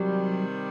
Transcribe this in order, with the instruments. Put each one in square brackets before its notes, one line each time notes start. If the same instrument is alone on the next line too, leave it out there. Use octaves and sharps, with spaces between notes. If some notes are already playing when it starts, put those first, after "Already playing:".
Already playing: [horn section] C3 D#3 G3 [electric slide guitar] F#3